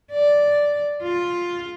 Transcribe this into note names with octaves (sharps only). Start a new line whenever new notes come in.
D5
F4